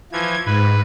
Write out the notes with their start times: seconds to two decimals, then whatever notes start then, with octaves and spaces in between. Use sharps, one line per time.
0.12 E3 F3 G#6
0.46 G#2 B4